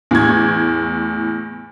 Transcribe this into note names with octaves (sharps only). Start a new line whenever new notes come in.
E2 A2 G#6